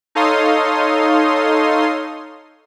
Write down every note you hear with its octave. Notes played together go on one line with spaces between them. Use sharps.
D#4 A4 C#5 F5 C6 D#6